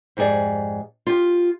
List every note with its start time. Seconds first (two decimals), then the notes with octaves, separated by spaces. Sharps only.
0.17 F2 G#2 G4 G#4 D5
1.07 F4 G4